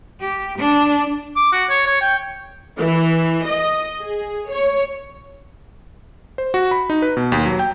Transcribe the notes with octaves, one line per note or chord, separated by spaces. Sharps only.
G4
D4
D6
F#4
C#5
C#5
G5
E3
D#5
G#4
C#5
C5
F#4
B5
D#4
B4
B2
D#2
F#3
G5